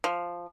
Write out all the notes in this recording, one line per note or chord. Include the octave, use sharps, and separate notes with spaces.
F3